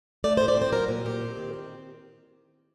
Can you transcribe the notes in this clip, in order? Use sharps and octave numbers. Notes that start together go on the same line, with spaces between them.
A3 D5
A2 C5
D5
C4 C5
F#3 A#4
A#2
A#2 G4
C4
D#3
C4